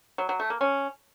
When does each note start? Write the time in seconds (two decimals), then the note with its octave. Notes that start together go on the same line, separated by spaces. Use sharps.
0.18 F#3
0.29 F#3
0.40 A3
0.50 A#3
0.61 C#4